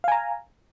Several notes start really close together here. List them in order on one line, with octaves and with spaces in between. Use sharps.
F5 G#5 A#5